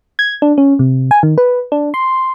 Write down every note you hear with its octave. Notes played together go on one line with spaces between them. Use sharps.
G#6
D4
C#4
C3
G#5
D#3
B4
D4
C6